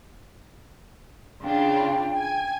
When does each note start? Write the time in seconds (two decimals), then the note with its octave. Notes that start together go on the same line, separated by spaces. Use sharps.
1.43 C#3 D4 F4 G5
2.16 G#5